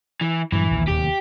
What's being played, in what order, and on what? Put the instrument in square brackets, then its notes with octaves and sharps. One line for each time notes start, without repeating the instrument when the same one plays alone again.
[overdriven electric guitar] E3
[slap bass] G2 A#2 F#3 [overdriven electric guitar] E3
[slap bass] A#1 D#2 A#2
[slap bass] D1 D#2 C3 [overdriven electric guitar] G4